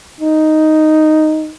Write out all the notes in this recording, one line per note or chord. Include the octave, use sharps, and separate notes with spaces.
D#4